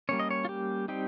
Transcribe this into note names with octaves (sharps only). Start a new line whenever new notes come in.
G3 A#3 C#4 C#5
D#5
C#5
F4
G4
G3 C4 D#4 G4